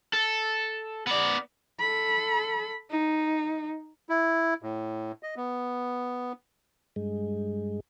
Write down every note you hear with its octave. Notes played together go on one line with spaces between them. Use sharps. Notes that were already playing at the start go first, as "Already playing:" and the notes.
A4
B3 D5
A4 B5
D#4
E4
A2
D#5
B3
G2 G#3